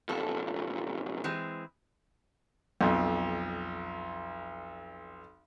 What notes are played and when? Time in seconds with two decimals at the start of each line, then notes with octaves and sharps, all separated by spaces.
0.09 B1 F2 A4
1.24 E3 G#3 C4
2.81 B1 F2